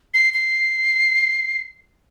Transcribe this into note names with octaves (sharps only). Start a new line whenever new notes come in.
C7
C7